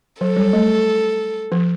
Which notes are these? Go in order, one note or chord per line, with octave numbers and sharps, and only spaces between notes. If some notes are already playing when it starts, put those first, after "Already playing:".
F#3 A4
G3
A3
F3